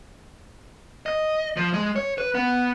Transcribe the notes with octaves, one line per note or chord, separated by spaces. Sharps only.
D#5
F3
G#3
C#5
B4
B3